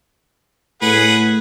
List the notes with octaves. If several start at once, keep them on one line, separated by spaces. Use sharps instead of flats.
A2 G#4 B4 F#5